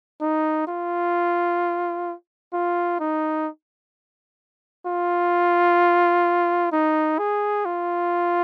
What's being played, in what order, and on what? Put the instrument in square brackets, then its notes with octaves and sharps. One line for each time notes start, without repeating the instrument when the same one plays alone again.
[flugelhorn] D#4
F4
F4
D#4
F4
D#4
G#4
F4